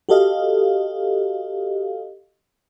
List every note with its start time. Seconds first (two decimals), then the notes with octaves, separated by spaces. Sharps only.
0.09 F#4 G4 A4 D#5 F5